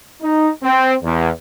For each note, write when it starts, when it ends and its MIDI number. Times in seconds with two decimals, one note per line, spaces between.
0.21 0.48 63
0.63 0.93 60
1.02 1.29 40